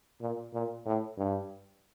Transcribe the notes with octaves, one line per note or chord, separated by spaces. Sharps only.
A#2
A#2
A2
G2